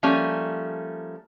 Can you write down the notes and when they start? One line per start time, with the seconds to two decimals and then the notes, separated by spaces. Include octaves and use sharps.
0.03 F3 G3 A3 A#3 C#4